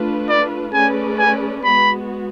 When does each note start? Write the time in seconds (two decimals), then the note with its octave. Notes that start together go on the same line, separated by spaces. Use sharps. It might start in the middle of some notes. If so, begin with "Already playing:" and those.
Already playing: A3 D4 F4 B4
0.29 D5
0.74 A3 C#4 G#4 B4 D5 G#5
1.19 G#5
1.64 G#3 B3 F#4 B5